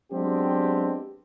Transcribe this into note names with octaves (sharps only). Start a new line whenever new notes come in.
F#3 G#3 B3 C4 D4 G4